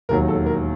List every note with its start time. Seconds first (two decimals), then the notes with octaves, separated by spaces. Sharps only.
0.09 E1 D#2 D#3 F#3 A#4
0.28 A4
0.46 A#4